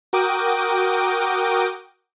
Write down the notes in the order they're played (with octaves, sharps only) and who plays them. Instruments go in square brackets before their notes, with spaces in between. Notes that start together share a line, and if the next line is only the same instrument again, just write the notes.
[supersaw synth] F#4 A#4 G5 D6 D#6